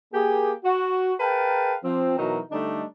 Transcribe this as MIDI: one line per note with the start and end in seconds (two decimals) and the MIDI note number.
0.13 0.52 58
0.13 0.52 67
0.13 0.52 68
0.65 1.13 66
1.20 1.74 68
1.20 1.74 70
1.20 1.74 71
1.20 1.74 77
1.20 1.74 79
1.20 1.74 81
1.83 2.15 53
1.83 2.15 60
2.18 2.40 47
2.18 2.40 52
2.18 2.40 54
2.18 2.40 63
2.18 2.40 70
2.51 2.83 50
2.51 2.83 55
2.51 2.83 57
2.51 2.83 62
2.51 2.83 63